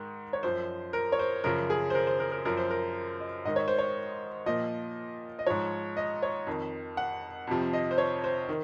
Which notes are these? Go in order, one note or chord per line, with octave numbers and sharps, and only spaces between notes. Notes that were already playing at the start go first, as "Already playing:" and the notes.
Already playing: G#2 D#3
C#5
F#2 F3 C5
A#4
C#5
C5
F#2 C#3 F3 A#4
G#4
C5
A#4
C5
A#4
A#4
F#2 F3 A#4
C5
A#4
D#5
G#2 D#3 D#5
C#5
C5
C#5
A#2 F3 D#5
D#5
G#2 F3 C#5
D#5
C#5
F2 D#3
F#5
F2 C3 F3
D#5
C5
C#5
C5
D#3